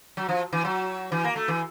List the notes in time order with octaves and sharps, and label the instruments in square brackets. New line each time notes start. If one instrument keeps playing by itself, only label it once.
[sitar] F#3
F3
E3
F#3
E3
A#3
A3
E3